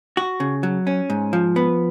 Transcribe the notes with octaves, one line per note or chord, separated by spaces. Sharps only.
F#4
C#3
F#3
C#4
G#2
F3
B3